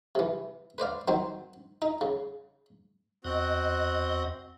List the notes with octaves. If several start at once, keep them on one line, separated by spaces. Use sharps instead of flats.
C3 E3
B4 C5 D5 F5
D#3 F#3 C4 C5
D#4
C#3
E2 C4 F#4 D#5 F#6